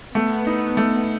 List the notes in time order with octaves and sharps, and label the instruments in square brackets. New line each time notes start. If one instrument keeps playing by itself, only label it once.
[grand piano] A3 [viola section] B3
[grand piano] D#4
A3